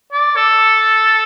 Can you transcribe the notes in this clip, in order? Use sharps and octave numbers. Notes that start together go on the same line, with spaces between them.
D5
A4